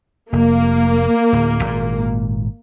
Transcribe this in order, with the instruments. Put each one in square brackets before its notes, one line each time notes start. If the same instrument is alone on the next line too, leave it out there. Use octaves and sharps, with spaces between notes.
[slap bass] F1 [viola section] A#3
[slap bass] D1
G#1 A#2